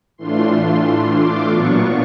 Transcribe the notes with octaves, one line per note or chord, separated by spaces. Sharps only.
A2 E3 A3 D4 F4 C6
D6
A#2 F#3 B3 D4 F4 C#6